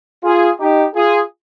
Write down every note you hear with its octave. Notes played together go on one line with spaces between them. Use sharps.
F4 G#4
D#4 G4
F4 G#4